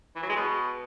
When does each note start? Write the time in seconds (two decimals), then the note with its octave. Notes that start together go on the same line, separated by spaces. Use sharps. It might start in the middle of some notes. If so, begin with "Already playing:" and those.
0.16 E3
0.23 F#3
0.29 G#3
0.36 B2